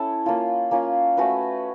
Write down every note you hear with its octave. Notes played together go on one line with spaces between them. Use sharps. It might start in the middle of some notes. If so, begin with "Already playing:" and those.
Already playing: C#4 E4 A4
A#3 C#4 F4
A#3 C#4 F4
A3 C#4 F#4 B4